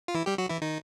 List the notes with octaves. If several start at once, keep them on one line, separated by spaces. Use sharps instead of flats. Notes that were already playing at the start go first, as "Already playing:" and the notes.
F4
E3 E4
G3 G4
F#3 F#4
E3 E4
D#3 D#4